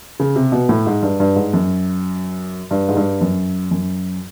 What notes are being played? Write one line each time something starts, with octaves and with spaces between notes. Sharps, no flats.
C#3
C3
B2
A2
G#2
G2
G2
G#2
F#2
G2
G#2
G2
F#2
F#2